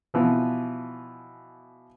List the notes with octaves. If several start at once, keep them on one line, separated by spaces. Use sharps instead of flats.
B2 E3 F3